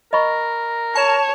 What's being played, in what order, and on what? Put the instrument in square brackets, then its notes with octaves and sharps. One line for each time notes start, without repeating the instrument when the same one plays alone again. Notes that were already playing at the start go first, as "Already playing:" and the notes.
[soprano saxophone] A#4 [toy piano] D#5 B5 C#6
[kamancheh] C#5 [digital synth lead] A5